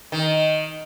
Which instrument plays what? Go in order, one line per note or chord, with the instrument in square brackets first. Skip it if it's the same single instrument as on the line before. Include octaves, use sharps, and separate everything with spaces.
[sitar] D#3